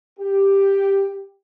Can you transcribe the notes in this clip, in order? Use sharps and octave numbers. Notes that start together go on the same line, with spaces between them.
G4